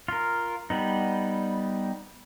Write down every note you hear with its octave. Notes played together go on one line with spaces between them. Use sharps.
F4 A#4
G3 B3 D#4